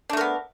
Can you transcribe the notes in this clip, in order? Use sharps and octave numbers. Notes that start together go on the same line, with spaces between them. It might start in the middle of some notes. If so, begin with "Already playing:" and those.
A3 B3 D4 A#4